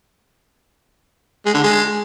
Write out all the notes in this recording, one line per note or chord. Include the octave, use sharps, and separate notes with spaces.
G#3
D3
G#3